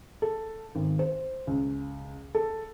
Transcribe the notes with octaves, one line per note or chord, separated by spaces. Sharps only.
A4
G#1
C5
C#2
A4